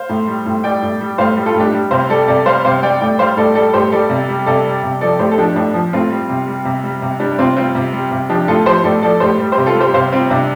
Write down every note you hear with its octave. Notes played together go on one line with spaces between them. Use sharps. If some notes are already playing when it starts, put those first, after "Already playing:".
Already playing: C5 F5
A2
G3
A2
G3 D5 G5
A2
G3
A2 C5 F5
G3
F4 A4
A2
D4 G4
G3
C3 C5 F5
G3 A4 D5
C3 A4 D5
G3 C5 F5
C3 C5 F5
G3 D5 G5
A2 D5 G5
G3 C5 F5
A2 A4 D5
G3 A4 D5
A2 G4 C5
G3 A4 D5
C3
G3
C3 A4 D5
G3
C3
F3 A4 D5
A2 G4 C5
A4
F3 D4 G4
A2 D4
F3
A2 C4 F4
G3
C3
G3
C3
G3
C3
G3 D4 G4
C3 C4 F4
G3 C4 F4
C3
G3
C3
F3 D4 G4
A2 F4 A4
F3 G4 C5
A2 A4 D5
F3 A4 D5
A2 G4 C5
G3
G4 C5
C3
F4 A4
G3
G4 C5
C3 C5 F5
G3 C4 F4
C3 D4